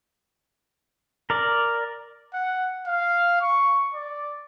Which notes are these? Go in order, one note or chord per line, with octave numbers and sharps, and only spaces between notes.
A#4 D5
F#5
F5
C#6
D5